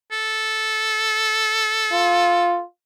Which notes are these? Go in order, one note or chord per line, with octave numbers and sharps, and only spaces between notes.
A4
F4